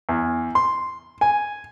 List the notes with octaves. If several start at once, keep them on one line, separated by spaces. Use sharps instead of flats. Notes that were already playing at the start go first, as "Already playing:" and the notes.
E2
C6
G#5